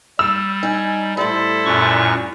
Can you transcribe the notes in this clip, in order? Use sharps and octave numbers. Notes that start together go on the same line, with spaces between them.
G3 E6
D#4 G#5
A2 G3 E4 A4 C5
F#2 A#2 C#6